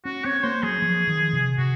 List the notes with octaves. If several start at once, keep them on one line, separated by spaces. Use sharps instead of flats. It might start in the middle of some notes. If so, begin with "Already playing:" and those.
C#4 F#4
C4 C#5
A#3 C5
F#3 G#4
F3
D#3
C3
C3 F#4